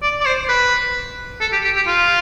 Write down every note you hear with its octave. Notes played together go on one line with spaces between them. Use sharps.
D5
D5
C5
B4
A4
G4
G4
G4
F4